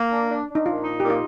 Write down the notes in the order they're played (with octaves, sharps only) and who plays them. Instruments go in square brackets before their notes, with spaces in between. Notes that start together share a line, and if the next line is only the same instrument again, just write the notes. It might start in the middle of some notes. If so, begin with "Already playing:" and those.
Already playing: [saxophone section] A#3
D4
D4
D4
[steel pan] D#4
[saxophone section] A#2 [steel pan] F4
[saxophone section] D#4
[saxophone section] A#2 [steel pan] G4
[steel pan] F4